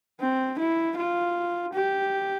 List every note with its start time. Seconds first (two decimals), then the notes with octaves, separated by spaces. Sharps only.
0.20 C4
0.59 E4
0.97 F4
1.73 G4